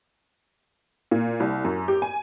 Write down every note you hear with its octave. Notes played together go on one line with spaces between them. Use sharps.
A#2
C2
F#2
G4
G#5